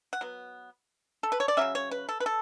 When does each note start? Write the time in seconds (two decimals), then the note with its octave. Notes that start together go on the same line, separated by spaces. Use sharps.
0.13 F#5
0.21 F#3 B3
1.23 A4
1.32 B4
1.40 C#5
1.48 D5
1.57 C#3 F#3 C#4 E5
1.75 C#5
1.91 B4
2.09 A4
2.20 B4
2.26 A4